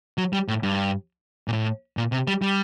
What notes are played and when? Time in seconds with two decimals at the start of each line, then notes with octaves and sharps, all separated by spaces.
0.18 F#3
0.33 G3
0.48 A2
0.63 G2
1.48 A#2
1.53 A2
1.97 A#2
2.12 C3
2.27 G3
2.42 G3